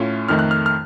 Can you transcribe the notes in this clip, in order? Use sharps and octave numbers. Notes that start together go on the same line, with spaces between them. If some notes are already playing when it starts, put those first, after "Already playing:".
Already playing: A2 A3 C#4 F4
F2 D#3 A3 D#4 F6
F#6
F6
F6